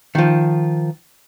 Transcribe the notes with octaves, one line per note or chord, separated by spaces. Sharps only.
D#3 F3